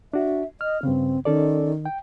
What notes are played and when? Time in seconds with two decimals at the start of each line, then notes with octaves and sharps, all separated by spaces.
0.13 D4 F#4 E5
0.61 D#5 F6
0.83 G2 C#3 C4
1.25 D#3 C#4 A4 D5
1.85 G5